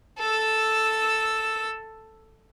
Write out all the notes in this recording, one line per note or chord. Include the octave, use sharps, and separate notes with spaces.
A4 E6